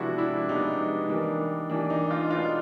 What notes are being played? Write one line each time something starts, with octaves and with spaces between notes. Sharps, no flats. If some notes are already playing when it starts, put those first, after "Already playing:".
Already playing: C3 F3 G#3 B3 D4 E4 F#4
D4 E4
C3 F3 G#3 B3 D4 D#4
E3 G3 A#3 D4
E3 G3 A#3 D4
D#4
D#4 F4
B2 G#3 B3 D4 D#4 F4